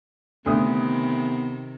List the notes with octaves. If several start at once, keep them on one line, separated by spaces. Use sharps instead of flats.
D2 C3 D#3 B3 D#6